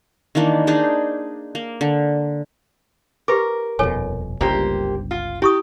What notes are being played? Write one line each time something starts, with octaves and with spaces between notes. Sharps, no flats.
D#3 E3 A#3 D4
D4 D#4 G#4 C5
A#3
D3
G4 A#4 B4 D6
D#1 F2 B2 A4 C#5 G#5
G1 C#2 G2 A#3 G4 C5
F4
E4 G4 C#6 D#6